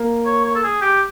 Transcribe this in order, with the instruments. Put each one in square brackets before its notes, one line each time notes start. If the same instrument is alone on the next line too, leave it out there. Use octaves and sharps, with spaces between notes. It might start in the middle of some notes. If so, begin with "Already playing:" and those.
Already playing: [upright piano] A#3
[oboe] C#5
C#5
A4
G#4
G4